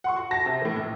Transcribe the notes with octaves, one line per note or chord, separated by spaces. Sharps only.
F#5 C6 C#6
F#4
A5 A#6
C3
A2 E3
A#1